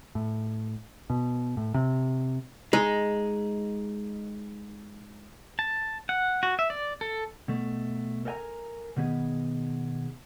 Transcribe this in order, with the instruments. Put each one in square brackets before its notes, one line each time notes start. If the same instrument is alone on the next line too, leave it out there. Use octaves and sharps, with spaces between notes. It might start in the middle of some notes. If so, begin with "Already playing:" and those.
[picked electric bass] A2
B2
A2
C3
[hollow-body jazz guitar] G#3 D#4
[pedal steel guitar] A5
F#5
F#4
E5
D5
A4
[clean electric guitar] B2 A3
A4 A#4 D5 G5 G#5 A#5
B2 D#3 B3 G#4